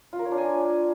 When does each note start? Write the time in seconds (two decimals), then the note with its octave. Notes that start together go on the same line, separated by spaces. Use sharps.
0.13 F4
0.19 A#4
0.25 C#5
0.31 D4
0.38 G#5